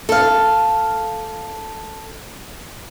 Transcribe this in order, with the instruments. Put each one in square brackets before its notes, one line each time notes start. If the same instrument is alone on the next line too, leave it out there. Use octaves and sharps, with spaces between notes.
[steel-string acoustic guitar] A4 F5